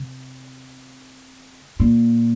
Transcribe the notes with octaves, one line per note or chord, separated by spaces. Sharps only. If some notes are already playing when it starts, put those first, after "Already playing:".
Already playing: C3
A#2